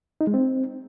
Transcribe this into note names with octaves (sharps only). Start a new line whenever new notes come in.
D#4
G#3
C4